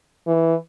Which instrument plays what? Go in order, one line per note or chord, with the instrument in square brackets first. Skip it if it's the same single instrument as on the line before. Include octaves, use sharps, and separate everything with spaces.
[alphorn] E3